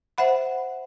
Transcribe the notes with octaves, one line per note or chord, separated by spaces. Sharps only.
C5 E5 F#5 B5